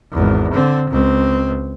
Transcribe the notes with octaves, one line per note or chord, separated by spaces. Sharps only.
G#1 E2
D3 C4
C#2 C4